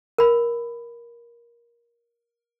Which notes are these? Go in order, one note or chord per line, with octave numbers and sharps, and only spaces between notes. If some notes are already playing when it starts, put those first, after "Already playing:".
A#4 B5